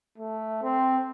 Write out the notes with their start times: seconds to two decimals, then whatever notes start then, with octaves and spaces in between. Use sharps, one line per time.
0.18 A3
0.63 C4